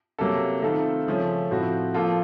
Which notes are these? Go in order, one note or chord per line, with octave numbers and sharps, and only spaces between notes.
C3 F#3 A#3 C#4 A4
D#3 A3 C4 F4 A4
C#3 F3 A3 C#4
A2 F3 C4 F#4
F3 A#3 F4 A4